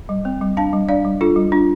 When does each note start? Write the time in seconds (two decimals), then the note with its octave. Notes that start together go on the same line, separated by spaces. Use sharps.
0.09 G3
0.25 C4
0.41 G3
0.57 D4 F5 A5
0.73 G3
0.89 D4 D5 F5
1.05 G3
1.21 D4 F4 A4
1.36 G3
1.52 D4 F4